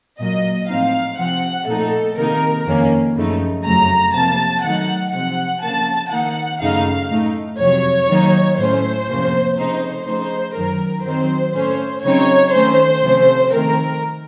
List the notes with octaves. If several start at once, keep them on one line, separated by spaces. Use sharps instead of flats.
A#2 F#3 A#3 D#5
A2 F3 C4 D#4 F5
C3 F3 C4 F#5
A#2 F3 A3 D#4 A4
C3 D#3 A#3 D#4 A#4
F2 D#3 A#3 C#4
F#2 C#3 F3 A3 D#4
F2 C#3 F#3 A3 A#5
C3 F3 A#3 A5
D#3 F#3 A3 D#4 F#5
C3 F3 C4 F#5
C#3 F3 A#3 A5
D#3 A#3 D#4 F#5
F#2 C#3 A3 D#4 F5
A2 A3 D#4
F2 C3 F#3 C#5
D#3 F#3 A#3 D#4
A2 A3 C#4 C5
F2 C3 F3 A#3 C#4
C#3 F3 A3 C4 D#4 C5
C#3 F3 A3 D#4 C5
F#2 D#3 F#3 A#4
D#3 F#3 C4 D#4 C5
A2 A3 C#4 C5
C#3 F#3 C4 D#4 C#5
D#3 A3 C#4 C5
C3 F3 A3 C#4
D#3 A3 C4 A#4